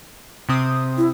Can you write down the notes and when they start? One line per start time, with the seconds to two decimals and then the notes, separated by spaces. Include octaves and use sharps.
0.49 C3 C4 D#6
0.97 E4